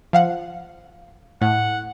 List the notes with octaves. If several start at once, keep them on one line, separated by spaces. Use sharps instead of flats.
F3 F5 F#5
A2 F#5